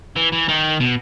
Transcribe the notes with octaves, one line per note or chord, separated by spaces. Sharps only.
E3
E3
D#3
B2